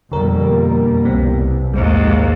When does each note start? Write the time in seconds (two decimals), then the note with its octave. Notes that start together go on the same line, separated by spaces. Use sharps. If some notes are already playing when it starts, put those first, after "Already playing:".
0.12 F2 B2 D3 G3 A#3 A#4
1.05 C2 B3 C4
1.74 A#1 D#2 G#2 G#3